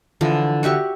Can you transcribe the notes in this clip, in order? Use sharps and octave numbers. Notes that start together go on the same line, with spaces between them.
D3 E3 F3
F#4 G4 E5 C#6